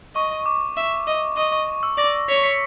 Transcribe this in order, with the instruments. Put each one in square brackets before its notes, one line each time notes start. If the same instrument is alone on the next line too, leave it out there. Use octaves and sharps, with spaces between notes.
[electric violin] D#5 [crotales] C#6
[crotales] D6
[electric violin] E5
D#5
[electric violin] D#5 [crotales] C#6
[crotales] C#6
E6
[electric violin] D5 [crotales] A#6
[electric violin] C#5 [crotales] B6
[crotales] B6 C#7